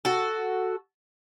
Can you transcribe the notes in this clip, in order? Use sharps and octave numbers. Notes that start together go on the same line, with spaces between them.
F#4 A4